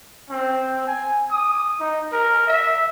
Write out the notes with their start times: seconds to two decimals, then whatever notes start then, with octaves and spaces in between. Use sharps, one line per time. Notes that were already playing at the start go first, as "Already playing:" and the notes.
0.30 C4
0.87 G#5
1.31 D#6
1.80 D#4
2.12 A#4
2.47 E5